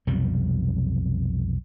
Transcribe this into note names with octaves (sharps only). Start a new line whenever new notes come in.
B1 F2 C3 G3